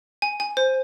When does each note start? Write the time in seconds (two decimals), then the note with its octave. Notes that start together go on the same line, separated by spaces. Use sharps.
0.22 G#5
0.40 G#5
0.57 C5